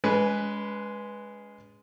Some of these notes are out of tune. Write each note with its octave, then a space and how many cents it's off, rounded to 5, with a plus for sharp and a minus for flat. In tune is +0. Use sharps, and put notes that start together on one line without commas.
G#3 +0 C#4 +40 B4 +0